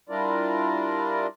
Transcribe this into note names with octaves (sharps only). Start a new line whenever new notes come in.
G3 D4 E4 F4 A#4 D5